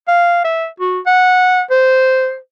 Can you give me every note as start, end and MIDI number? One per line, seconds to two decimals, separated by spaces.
0.08 0.44 77
0.45 0.66 76
0.80 0.99 66
1.06 1.61 78
1.70 2.37 72